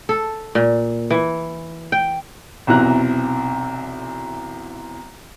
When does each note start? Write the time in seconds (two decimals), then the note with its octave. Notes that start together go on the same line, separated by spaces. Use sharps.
0.09 A4
0.55 A#2
1.10 E3
1.92 G5
2.67 B1 E2 C3 E3 A#5 F#6